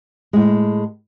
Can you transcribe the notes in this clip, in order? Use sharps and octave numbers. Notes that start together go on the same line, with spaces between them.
A2 G#3